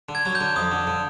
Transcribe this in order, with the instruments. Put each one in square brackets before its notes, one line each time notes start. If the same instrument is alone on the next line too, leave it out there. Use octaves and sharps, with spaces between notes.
[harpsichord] D3
[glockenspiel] G#6
[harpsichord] F#3
[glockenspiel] G6
[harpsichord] D3
[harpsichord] F2 [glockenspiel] D#6
[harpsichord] D3
D3